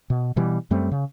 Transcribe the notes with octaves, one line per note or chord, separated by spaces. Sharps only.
B2
B2 E3 G3
F#2 G3 A3 C4
C#3